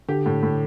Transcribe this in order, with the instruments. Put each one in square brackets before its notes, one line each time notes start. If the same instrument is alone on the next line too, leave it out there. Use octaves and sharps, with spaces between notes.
[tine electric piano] D3 [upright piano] G4
[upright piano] A2
A2